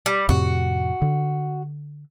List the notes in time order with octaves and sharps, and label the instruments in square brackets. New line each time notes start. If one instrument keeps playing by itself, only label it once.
[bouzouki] G3
[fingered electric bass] F2 A2 C3 [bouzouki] F#4
[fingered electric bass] D3